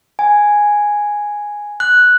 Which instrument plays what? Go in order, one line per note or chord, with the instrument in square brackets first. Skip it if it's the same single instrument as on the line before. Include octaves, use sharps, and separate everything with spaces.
[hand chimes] G#5
F#6